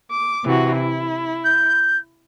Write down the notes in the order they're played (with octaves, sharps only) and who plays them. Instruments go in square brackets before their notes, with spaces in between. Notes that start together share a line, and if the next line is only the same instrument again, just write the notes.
[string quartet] D6
C3 E3 F#4
E4
[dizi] G6